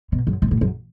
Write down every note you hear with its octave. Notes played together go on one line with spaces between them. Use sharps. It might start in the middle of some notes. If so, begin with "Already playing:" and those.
B2
F#2
G#2
A2
F#2